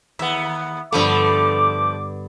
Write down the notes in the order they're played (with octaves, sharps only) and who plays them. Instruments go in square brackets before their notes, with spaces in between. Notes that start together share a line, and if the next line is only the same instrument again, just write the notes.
[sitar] D#2 B3 [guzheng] E5
[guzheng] G2 D3 B3 [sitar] F3 A3 [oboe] D6